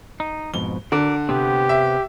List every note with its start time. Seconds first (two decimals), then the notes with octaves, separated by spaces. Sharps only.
0.20 D#4
0.54 F2 G#2 B2 G7
0.92 D3 F#4 A#4 D5
1.29 C3 B3 C4 G4
1.69 E5